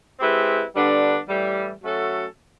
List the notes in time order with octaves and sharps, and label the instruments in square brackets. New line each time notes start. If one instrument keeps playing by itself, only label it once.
[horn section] G#3 C4 E4 G4 B4
D3 G3 B3 D4
A2 E3 G3
F#3 A3 C#4 F#4 A4